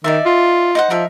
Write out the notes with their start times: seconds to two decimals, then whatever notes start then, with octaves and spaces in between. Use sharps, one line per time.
0.04 D#3 D#4 D5 E5
0.25 F4
0.75 D#4 C5 F#5
0.90 F3 D#4 A#4 E5